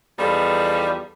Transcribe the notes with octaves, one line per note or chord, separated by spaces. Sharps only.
E2 F3 G3 D#4 A4 B4